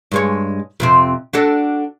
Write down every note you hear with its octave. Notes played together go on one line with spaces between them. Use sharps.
G2 G#3 C#5
F2 C3 C4
D4 F#4 A4